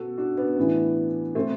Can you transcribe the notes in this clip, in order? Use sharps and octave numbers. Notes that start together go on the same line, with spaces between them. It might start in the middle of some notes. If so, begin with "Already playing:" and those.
Already playing: B2 F#4 A4
D4 F#4
B3 D4
A2 E3
B2 A3 C4